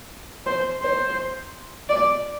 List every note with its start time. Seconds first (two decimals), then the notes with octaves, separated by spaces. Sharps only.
0.46 C5
0.82 C5
1.89 D5